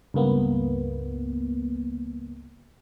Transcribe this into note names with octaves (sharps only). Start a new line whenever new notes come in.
C#2 G2 A#3 B3